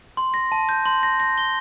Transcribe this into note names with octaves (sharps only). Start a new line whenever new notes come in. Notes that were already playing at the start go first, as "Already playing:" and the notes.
C6
A#6
A5
G6
C6
A#6
A#6
G7